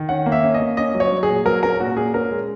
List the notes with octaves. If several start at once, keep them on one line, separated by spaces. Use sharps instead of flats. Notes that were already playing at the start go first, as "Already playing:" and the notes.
Already playing: D#3
C#4 F#5
A#3
E5
C#4
D#5
A#3
C#4 D#5
F#3
C#5
F#3
G#4
A#2
F#3 A#4
C#4 A#4
A#2 F#4
A#2 G#4
C#4 A#4
G#3